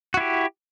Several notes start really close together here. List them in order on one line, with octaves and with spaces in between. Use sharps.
F#4 E4 G4